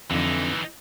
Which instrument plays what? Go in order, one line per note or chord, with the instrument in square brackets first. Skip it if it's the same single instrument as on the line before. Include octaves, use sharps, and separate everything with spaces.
[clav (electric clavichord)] F2 D3 [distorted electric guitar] E3 D#4